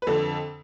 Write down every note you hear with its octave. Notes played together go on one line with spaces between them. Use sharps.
B4
F2 D3 A4